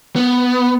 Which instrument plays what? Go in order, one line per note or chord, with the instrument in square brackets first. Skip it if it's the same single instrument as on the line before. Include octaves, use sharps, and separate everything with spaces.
[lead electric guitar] B3